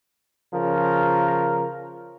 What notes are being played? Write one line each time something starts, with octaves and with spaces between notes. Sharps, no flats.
C#3 F3 A#4